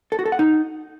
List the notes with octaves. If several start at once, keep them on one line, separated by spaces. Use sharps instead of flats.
A4
F#4
A4
F#5
D#4